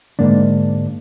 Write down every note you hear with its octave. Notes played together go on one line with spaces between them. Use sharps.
G#2 D3 G#3 A#3 D4